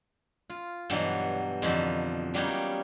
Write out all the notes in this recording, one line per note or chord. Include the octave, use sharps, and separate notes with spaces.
F4
G2 B2 E3 F#3
F2 B2 D3 E3 D#4 B5
F#3 G3 A#3 B3 C#4 D#4